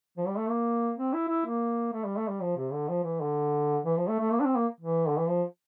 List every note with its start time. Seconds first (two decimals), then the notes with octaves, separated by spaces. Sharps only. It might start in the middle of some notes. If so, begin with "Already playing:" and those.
0.17 F3
0.27 G3
0.38 A3
0.49 A#3
0.98 C4
1.14 E4
1.29 E4
1.46 A#3
1.93 A3
2.05 G3
2.17 A3
2.28 G3
2.41 F3
2.57 C3
2.72 D3
2.89 F3
3.04 E3
3.21 D3
3.85 E3
3.97 F3
4.09 A3
4.20 A3
4.32 A#3
4.40 D4
4.45 C4
4.56 A#3
4.81 E3
5.08 D3
5.19 E3
5.28 F3